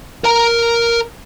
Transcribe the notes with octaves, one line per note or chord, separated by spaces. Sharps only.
A#4 A#5